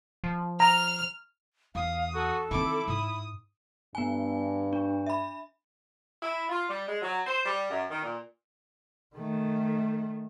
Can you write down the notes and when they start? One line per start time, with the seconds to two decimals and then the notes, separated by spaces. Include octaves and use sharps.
0.24 F3
0.60 A#5 F6
1.75 E2 F5 D#6
2.15 F#4 A4
2.51 D#3 C4 E4 D6
2.88 G#2 D#6
3.95 G2 B3 G#5
4.73 D4
5.06 E5 B5
6.21 E4
6.49 F4
6.68 G3
6.87 G#3
7.02 F#3
7.26 C5
7.45 G3
7.70 F#2
7.89 D#3
8.02 A#2
9.15 D#3 A3